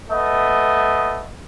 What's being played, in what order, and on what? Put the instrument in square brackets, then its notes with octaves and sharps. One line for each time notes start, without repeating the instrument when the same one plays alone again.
[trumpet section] A3 B3 D#5